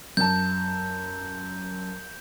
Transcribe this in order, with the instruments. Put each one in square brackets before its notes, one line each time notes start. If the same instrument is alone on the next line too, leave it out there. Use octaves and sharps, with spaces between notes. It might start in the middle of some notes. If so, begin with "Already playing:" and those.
[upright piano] F#2 A5 [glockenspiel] G6